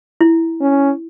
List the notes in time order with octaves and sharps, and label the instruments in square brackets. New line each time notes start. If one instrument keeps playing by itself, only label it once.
[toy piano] E4
[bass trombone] C#4